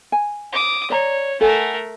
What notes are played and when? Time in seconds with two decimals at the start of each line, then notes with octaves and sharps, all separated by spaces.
0.12 G#5
0.52 D6 D#6
0.90 C#5 D5 A#5
1.41 A3 A4 A#4 F#5 G#5